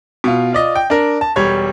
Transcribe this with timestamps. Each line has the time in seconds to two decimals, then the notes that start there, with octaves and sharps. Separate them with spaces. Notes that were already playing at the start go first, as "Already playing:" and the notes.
0.24 B2 F4
0.53 F4 D5 D#5
0.75 G5
0.90 D4 A#4
1.21 A5
1.36 E1 G3 C#5 G#6